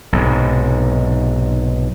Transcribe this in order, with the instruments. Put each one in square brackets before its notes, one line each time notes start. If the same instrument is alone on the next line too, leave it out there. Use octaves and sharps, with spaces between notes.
[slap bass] B1 G#2 C3